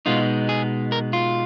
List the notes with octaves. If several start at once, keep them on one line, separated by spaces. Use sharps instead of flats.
B2 G#3 B3 D#4 F4
G#4
A#4
F4